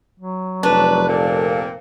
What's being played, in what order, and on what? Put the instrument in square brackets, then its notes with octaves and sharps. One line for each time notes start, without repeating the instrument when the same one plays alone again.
[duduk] F#3
[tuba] F1 [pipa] D4 [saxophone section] B4
[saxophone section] A#2 A#3 C4 [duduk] A4